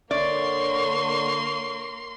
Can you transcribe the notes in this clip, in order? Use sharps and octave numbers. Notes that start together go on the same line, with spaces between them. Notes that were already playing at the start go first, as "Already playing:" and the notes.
D3 A#3 C#5 D5 C6 C#6